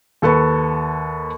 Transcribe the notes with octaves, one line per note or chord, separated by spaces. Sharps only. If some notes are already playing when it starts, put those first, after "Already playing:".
D#2 A4 B4 C#6